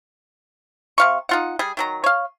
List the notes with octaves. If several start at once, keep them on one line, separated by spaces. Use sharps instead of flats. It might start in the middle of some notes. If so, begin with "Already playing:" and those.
C3 F5 C#6
D#4 F4 F#5
G3 G#4
D#3 F#3 A#5
C#5 F5